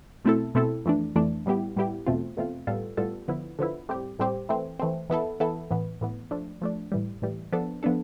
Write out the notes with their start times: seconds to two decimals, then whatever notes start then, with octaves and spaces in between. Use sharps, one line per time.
0.25 B2 A3 C4 E4 A4
0.55 B2 A3 C4 E4 A4
0.86 F2 E3 A3 D4
1.16 F2 E3 A3 D4
1.46 A2 G3 B3 E4 G4
1.76 A2 G3 B3 E4 G4
2.07 E2 B2 A3 C4 F4
2.37 E2 B2 A3 C4 F4
2.67 A2 G3 B3 F4 A4
2.97 A2 G3 B3 F4 A4
3.28 D3 F3 B3 E4
3.59 D3 F3 B3 E4
3.89 A2 G3 C4 G4
4.19 A2 G3 C4 G4
4.49 E3 A3 C4
4.80 E3 A3 C4
5.10 E3 B3 E4 A4
5.40 E3 B3 E4 A4
5.71 A2 E3 B3
6.01 A2 E3 B3
6.31 F3 A3 D4
6.62 F3 A3 D4
6.92 A2 E3 G3
7.22 A2 E3 G3
7.52 F3 B3 D4 A4
7.83 F3 B3 D4 A4